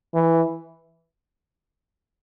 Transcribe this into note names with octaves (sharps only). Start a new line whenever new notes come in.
E3